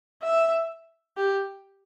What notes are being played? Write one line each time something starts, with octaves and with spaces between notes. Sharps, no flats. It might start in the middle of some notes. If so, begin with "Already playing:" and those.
E5
G4